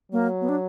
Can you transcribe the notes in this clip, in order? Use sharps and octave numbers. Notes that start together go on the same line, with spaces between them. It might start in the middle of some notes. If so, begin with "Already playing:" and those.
F#3 A#3
B3
D4